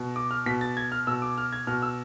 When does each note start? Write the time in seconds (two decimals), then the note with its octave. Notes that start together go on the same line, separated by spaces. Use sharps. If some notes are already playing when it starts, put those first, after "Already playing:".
Already playing: B2
0.16 D6
0.31 F6
0.46 B2 B6
0.61 A6
0.77 G#6
0.92 F6
1.07 B2 E6
1.22 D6
1.38 F6
1.53 G#6
1.67 B2 F6
1.82 E6